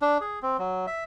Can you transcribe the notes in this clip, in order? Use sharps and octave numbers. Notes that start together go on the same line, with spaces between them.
D4
G#4
C4
F#3
E5